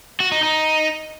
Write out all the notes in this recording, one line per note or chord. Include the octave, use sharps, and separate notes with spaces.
F#4
D#4
D#4